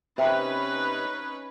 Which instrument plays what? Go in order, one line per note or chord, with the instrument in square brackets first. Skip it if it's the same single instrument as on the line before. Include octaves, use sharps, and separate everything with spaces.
[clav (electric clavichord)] C3 [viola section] C#4 D#4 B4